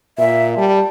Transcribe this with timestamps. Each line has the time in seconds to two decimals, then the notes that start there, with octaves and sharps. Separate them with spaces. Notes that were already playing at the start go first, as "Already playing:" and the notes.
0.18 A#2 E5
0.57 G3 A5